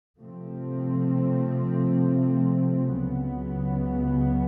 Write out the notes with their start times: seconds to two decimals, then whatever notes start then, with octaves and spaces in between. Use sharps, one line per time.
0.19 C3 F3 A3 C4
3.00 C#2 C#3 F#3 B3